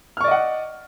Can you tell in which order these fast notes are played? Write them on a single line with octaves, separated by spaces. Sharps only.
F6 C#6 D5 D#5 F#5